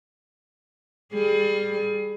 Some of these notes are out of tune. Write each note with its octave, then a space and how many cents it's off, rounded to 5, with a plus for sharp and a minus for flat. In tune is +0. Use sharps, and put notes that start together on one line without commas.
G3 +20 G#4 +30